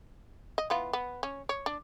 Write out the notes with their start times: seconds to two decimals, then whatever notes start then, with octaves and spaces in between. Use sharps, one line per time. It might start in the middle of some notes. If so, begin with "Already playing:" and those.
0.58 D#5
0.70 E3 B3 F4
0.93 B3
1.23 C#4
1.49 C#5
1.66 D4